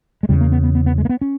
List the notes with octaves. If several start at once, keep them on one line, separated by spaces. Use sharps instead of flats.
G#3
E2 C#3 G3
A#3
B3
B3
B3
B3
G#3
A#3
B3
C#4